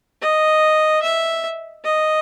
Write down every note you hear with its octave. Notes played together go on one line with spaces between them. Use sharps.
D#5
E5
D#5